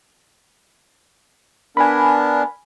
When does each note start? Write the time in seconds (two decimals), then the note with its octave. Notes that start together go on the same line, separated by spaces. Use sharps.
1.77 B3 D4 A#4 G#5 B5